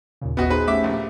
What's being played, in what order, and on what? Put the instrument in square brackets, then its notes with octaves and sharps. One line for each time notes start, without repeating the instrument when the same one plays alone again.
[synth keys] D#2 A#2 C#3
[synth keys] G#1 D#2 [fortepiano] B3 F#4 D#5
[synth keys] D#4 G#4 C5 [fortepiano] B4
[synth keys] A3 C#4 G4 [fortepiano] E5 D6
[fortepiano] A#1